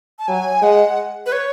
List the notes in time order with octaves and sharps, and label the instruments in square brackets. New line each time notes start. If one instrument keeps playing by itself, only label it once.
[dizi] A5
[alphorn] F#3 [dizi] G#5
[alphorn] G#3 [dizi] F#5
[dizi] B4
C#5